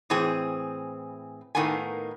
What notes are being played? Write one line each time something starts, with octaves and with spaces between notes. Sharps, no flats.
A2 E3 C4 G#4
A2 D#3 A#3 B3 G#5